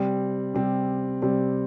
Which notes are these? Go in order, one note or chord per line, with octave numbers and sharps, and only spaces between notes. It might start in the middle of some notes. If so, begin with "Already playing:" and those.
Already playing: C3 G3 C4
C3 G3 C4
C3 G3 C4